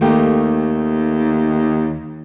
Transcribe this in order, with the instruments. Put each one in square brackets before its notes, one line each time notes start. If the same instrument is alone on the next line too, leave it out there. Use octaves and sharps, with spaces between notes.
[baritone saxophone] D#2 [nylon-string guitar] A3 A#3 G4